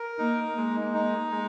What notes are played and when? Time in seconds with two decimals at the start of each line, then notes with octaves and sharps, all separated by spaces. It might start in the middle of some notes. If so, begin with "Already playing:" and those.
Already playing: A#4
0.18 A#3 D#4
0.57 G#3 A#3
0.94 D#4
1.31 G#3